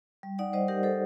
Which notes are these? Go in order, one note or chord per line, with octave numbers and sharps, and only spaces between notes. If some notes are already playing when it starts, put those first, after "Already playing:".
G3
D#4 D5 F#5
G3 C5 D#5
D#4 G4 A#4
G3 A4 C5